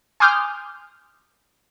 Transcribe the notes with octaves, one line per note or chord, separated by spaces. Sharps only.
G#5 C6 D6 D#6 F6 G6